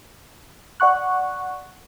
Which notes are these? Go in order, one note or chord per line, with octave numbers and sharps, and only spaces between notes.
D5 F#5 C#6 F#6